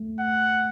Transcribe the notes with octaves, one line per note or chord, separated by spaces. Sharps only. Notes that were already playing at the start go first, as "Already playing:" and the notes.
Already playing: A3
F#5